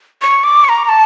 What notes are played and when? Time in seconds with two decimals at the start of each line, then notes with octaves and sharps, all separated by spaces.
0.22 C#6
0.44 D6
0.64 C#6
0.69 A#5
0.84 A#5
0.89 A5